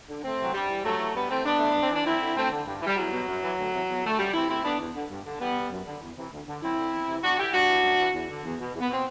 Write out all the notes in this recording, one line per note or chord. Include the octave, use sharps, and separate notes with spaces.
D3
D2 A3 C4
C3 E3 F#3
G2 G3
E3
G2 F#3 A3
E3
G2 G3 B3
E3 A3 C4
G2 B3 D4
E3 A3
B3
G2
C4
E3 D4
F#2 C4 E4
D3
D2 A3 C4
D3
G2
E3
G3
E2 F#3
B2
F#2
E3
D2
C3 E3
E2
D3 A3
F#2 G3
E3 C4 E4
D2 C4 E4
D3 B3 D4
E2
D3
G2
D3
E2 G3 B3
B2
F#2
D3
E2
C3 E3
D2
D3
F#2 C4 E4
D3
E2
C3 E3
E2 D4 F#4
D3 E4 G4
G2 D4 F#4
E3
F#2
E3
E2
D3
E2
B2
E2
B3
B2 C4